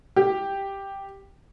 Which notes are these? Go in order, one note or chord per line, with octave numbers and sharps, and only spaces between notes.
G4